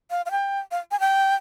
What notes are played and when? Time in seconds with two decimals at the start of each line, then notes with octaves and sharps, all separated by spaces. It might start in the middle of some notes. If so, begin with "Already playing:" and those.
0.10 F5
0.26 F5
0.31 G5
0.71 F5
0.91 G#5
1.00 G5